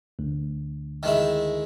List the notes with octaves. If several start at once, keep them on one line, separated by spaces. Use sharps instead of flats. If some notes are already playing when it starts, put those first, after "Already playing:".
D2
D#3 G#3 E4